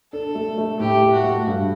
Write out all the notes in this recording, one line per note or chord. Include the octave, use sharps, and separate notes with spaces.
D4 A4
A3
A3
A2 G4
A3
F#4
A3
G2